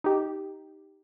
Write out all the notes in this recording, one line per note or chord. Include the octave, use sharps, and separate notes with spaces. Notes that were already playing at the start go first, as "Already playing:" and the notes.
D#4 G4